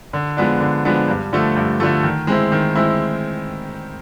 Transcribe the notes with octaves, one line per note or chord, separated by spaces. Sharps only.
D3
F3 G#3 B3 D4
D3
F3 G#3 B3 D4
G2
D3 F3 A3
G2
D3 F3 A3
D#3
G#3 C4 E4
D#3
G#3 C4 E4